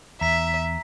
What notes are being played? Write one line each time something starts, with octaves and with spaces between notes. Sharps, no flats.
E2 E5 A#5 B6